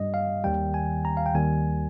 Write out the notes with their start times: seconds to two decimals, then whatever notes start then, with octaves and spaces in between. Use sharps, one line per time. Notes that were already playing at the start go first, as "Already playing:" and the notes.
Already playing: G2 G3 D#5
0.14 F5
0.44 D#2 D#3 G3 G5
0.74 G#5
1.05 A#5
1.17 F5
1.26 G5
1.34 D#2 D#3 G3 G#5